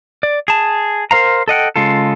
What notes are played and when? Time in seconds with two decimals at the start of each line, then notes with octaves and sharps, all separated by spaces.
0.23 D5
0.48 G#4 A5
1.11 A#4 C5 F5 A#5
1.48 A4 D#5 F#5 G5
1.76 C#3 G#3 F4 A4